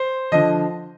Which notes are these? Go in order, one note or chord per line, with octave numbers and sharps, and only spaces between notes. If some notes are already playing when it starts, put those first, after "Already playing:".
Already playing: C5
D3 F3 D#5